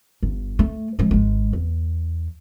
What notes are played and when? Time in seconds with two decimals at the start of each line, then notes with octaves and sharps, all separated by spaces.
0.23 G1
0.59 A3
0.99 F3 G#3
1.11 G#1 G#3
1.53 E2